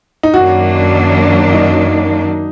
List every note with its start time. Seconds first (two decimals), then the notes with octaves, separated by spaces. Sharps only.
0.23 D#4
0.34 F#2 D#3 F#3 A#3 D4 F#4
1.53 D#4